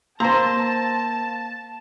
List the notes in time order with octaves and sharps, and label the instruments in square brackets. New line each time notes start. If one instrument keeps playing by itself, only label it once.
[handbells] A#3 A#6 [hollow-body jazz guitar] C5 A#5 [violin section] A5